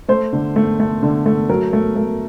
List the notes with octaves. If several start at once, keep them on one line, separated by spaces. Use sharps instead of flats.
A3 C5
D3
A3
A3
D3
A3
F#3 A#4
A3
A3